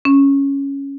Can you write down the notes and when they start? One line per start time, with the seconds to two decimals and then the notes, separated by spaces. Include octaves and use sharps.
0.05 C#4